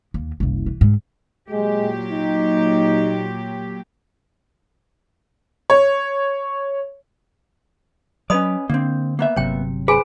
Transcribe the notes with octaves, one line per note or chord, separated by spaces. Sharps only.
D#2
F#1 C2
E3
G#2
A#2 F#3 G#3 G4
D#4
C#5
F#3 C#4 B4 D5 D#5 B5 D#6
D3 A#3 C4 D4
A#3 B3 E5
G1 C3 F#3 C#5 G5
G#4 B4 C5 G#5